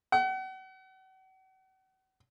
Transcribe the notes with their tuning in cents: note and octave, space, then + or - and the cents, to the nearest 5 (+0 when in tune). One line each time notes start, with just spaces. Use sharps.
F#5 +40